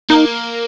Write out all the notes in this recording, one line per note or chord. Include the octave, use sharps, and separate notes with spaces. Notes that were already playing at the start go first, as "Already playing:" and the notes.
A#3 D#4